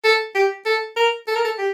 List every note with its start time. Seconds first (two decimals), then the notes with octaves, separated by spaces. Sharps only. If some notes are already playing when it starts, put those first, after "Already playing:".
0.04 A4
0.35 G4
0.66 A4
0.96 A#4
1.27 A4
1.36 A#4
1.45 A4
1.59 G4